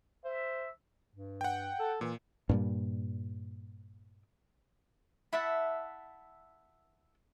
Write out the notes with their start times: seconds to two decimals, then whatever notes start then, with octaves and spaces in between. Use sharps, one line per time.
0.24 C5 E5
1.14 G2
1.41 F#5 G5
1.79 A4
2.01 A#2 E3
2.49 G2 A#2 G3
5.33 E4 E5 F#5 A5